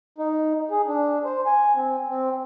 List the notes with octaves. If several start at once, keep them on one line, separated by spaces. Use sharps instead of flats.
D#4
G#4
D4
C5
G#5
C4
C4